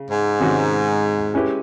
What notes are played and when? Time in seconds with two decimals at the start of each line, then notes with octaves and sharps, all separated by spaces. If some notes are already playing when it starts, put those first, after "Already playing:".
Already playing: C#3
0.09 G#2
0.40 C3 D#3 G#3 C#4 F#4
1.34 G#3 C#4 E4 G4 B4